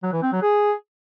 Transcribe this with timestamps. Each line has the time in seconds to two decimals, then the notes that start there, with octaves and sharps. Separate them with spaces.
0.03 F#3
0.13 E3
0.22 C4
0.32 F#3
0.42 G#4